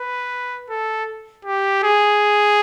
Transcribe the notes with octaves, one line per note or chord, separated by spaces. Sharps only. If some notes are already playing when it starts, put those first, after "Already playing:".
Already playing: B4
A4
G4
G#4